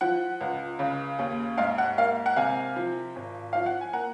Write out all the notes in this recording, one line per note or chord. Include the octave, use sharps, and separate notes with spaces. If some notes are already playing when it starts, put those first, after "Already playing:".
F3 F#5
C#2
C#3
D#2
G#2 F5
F#5
A#3 F5
F#5
C3 F5 G#5
F3
G#1
F3 F5
F#5
G#5
A#3 F#5 A#5